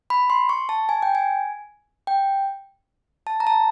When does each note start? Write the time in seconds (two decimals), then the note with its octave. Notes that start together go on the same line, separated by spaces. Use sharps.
0.10 B5
0.30 C6
0.49 C#6
0.69 A5
0.89 G#5
1.02 G5
1.15 G#5
2.07 G5
3.27 A5
3.40 A#5
3.47 A5